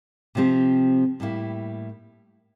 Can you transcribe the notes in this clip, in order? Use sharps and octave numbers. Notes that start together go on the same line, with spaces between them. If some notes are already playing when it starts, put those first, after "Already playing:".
C3 F3 C4 G4
A2 G3 A#3 E4